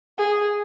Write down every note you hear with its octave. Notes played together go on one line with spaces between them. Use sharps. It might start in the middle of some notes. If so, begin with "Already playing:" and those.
G#4